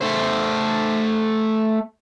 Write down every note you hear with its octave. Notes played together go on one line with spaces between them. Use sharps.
A3 C5